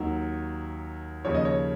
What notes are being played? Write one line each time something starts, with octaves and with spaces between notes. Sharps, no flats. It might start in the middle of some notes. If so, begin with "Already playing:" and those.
Already playing: D#2 D#3 F#3
D#2 C#3 F3 C#5
D#5
C#5